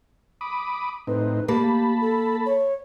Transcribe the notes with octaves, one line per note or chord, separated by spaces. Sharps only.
B5 D6 D#6
A2 C4 D#4 B4
A#3 G4 A5 B5
A4
C#5